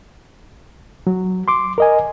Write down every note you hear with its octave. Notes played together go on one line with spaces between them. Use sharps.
F#3
C6 D6
A#4 D#5 G#5